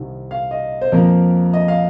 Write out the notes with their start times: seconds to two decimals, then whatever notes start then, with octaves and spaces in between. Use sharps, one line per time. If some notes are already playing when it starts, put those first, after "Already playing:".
Already playing: C2 C3 D#3
0.31 F5
0.51 D#5
0.81 C5
0.92 F2 F3 A#3 A#4
1.53 D#5
1.68 F5